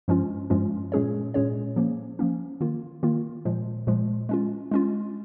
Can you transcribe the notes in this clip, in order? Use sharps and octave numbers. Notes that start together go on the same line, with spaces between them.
G2 F3 G#3 C#4 F4
G2 F3 G#3 C#4 F4
A#2 G#3 C#4 G#4 C#5
A#2 G#3 C#4 G#4 C#5
F3 A#3 C#4
F3 A#3 C#4
D#3 A#3 F4
D#3 A#3 F4
A#2 F3 G#3
A#2 F3 G#3
G#3 C#4 F4
G#3 C#4 F4